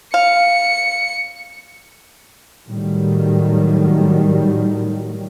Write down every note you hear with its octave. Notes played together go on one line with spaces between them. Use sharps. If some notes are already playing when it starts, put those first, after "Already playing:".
F5 C#7
A2 D#3 F#3 G3